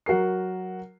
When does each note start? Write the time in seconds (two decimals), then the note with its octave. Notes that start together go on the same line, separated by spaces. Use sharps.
0.06 F#3 F#4 A#4 C7